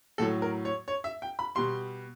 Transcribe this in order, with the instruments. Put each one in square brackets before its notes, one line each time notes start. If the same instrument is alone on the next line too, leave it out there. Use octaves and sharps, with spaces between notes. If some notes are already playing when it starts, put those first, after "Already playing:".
[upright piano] A2 F#3 A4
A#4
C#5
C#5
E5
G5
B5
B2 G3 C6